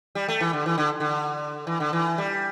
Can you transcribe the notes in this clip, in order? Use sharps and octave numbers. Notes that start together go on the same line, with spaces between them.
G3
A3
E3
D3
E3
D3
D3
E3
D3
E3
G3